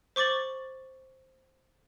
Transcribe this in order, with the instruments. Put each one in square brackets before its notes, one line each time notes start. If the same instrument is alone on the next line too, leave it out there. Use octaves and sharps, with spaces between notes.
[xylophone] C5 C#6 D6 A6 F#7